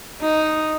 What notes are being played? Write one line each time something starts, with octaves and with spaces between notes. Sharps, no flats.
D#4